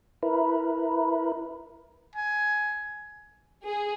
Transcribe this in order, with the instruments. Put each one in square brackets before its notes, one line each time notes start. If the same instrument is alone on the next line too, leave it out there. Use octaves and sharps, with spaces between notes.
[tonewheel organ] E4 A#4 B4
[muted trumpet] G#5
[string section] G#4